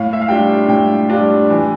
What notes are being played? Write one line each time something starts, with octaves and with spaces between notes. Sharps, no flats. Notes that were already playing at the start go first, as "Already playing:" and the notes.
Already playing: A2 F5
E5
F5
G3 D4 F4 G5
A2 G5
G3 D4 F4
E3